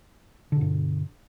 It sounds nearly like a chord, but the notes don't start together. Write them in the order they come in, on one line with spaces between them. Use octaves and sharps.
D3 B2 G2